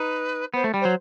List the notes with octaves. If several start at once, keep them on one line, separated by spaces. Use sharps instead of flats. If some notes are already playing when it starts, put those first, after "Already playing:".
Already playing: D#4 B4
B3 C5
A3
G3
F#3 C5